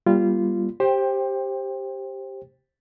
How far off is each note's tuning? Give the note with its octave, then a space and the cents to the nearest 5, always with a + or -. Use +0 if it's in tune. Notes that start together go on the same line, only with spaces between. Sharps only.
G3 +0 A#3 +45 F4 -20
G4 +0 C5 +15 G5 +15